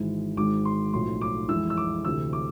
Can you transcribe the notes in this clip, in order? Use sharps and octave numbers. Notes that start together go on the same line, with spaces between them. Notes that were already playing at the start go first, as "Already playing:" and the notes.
Already playing: G#1 G#2 E3 G#3
G#1 G#2 G#3 D6
C6
B1 A2 F3 C6
D6
F2 E3 G#3 E6
E6
D6
D2 C3 E3 E6
D6